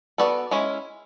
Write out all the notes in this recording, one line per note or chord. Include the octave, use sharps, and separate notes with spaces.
B3 F#4 A4 D5
G#3 C#4 E4